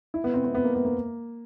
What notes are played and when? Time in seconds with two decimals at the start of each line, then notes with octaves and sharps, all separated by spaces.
0.14 E4
0.24 B3
0.34 C4
0.44 C4
0.55 B3
0.64 A#3
0.74 B3
0.85 A#3